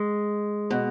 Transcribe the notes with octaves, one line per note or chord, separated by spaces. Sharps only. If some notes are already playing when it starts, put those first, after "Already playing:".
Already playing: G#3
B2